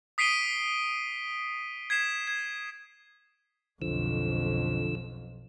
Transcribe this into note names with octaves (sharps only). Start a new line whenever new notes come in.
D#6 B6 C7 D7 D#7 G7
G#6 B6 C7 E7
G#6
B1 F2 D3 F3 E6